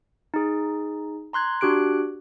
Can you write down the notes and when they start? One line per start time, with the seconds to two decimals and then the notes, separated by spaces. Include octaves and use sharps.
0.34 D#4 G#4
1.33 A#5 C6 F#6 G#6
1.61 D4 F#4 G4 F#6 D7